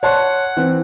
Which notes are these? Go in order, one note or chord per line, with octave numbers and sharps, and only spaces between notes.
C#5 F#5 A5 C6
E3 C4